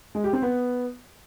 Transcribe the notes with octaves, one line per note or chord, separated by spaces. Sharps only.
G#3
G4
C4
B3